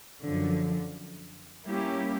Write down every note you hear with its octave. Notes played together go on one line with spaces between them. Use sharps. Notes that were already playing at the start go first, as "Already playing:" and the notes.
F#2 D3 F3
G3 A#3 C#4 E4 G4